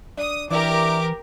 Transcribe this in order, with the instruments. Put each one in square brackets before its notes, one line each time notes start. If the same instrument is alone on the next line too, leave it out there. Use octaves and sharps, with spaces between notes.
[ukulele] D4 [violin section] D#6
[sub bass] E3 [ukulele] D4 E4 D5 [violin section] G4 A#4 [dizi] D6